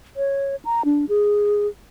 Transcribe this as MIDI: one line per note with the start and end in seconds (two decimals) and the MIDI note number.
0.16 0.56 73
0.65 0.82 82
0.85 1.05 62
1.09 1.67 68